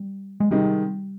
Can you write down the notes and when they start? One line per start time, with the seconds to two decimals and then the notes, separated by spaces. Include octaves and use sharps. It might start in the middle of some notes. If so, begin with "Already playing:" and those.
Already playing: G3
0.40 G#3
0.51 C3 D#3 G3 G#3 D#4